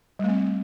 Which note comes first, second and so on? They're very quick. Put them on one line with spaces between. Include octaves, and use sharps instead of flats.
G3 A3 C4